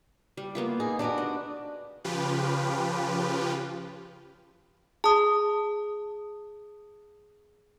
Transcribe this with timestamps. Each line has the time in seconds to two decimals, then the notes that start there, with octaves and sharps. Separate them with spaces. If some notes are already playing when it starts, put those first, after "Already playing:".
0.37 G3
0.55 A#3 B3 F4
0.80 D#4 G#4
0.99 D4 F#4 G4 A#4 B4
1.18 D#5
2.04 C#3 F3 F4 G4 B4
5.04 G#4 A5 D#6